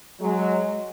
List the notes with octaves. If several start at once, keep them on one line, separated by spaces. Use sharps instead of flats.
F#3 G#3